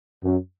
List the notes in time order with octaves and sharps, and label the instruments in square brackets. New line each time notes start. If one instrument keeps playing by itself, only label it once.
[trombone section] F#2